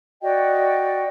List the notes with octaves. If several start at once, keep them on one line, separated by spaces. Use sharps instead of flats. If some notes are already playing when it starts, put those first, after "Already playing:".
F#4 D5 D#5 G5